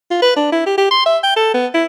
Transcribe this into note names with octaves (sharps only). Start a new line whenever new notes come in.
F4
B4
D4
E4
G4
G4
C6
E5
G5
A4
B3
E4